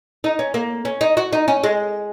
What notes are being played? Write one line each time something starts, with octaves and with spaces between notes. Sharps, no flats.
D#4
C#4
A#3
C#4
D#4
F#4
D#4
C#4
G#3